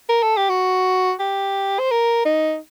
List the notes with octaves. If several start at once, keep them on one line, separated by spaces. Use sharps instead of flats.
A#4
A4
G4
F#4
G4
C5
A#4
D#4